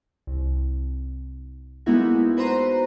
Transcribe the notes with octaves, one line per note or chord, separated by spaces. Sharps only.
C2
G#3 A#3 B3 D#4 E4 F#4
F#4 B4 C5 A#5 C6